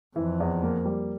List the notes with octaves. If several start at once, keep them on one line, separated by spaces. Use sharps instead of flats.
F2 E3
E2
A#3
G3